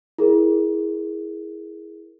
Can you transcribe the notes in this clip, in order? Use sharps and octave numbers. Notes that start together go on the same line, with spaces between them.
E4 G#4 A#4